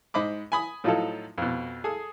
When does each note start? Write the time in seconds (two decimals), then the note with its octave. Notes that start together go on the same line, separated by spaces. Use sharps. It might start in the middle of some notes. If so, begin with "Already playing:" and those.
0.14 G#2 C5 D#5 B5 D6
0.52 G#5 B5 D#6
0.84 A2 F3 F#3 D#4 F4 A4
1.38 F2 B2
1.84 G#4 A4 D#6